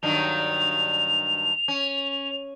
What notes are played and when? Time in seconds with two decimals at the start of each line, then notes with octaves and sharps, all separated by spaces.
0.03 G2 D#3 F#3 F7
1.68 C#4